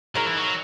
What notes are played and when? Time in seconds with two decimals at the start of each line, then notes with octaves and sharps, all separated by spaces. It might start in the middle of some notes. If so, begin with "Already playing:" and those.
0.15 F#3 G#3 D#4 A#4
0.27 E3
0.37 F#3